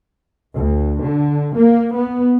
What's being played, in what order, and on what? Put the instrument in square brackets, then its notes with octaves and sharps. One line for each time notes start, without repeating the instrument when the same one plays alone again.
[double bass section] D2
D3
A#3
B3